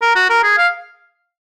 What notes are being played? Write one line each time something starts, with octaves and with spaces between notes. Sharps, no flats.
A#4
F#4
A#4
G#4
F5